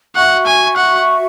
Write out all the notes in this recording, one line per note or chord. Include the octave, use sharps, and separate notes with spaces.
F#4 E5 F#5 C#6
G#5
F#5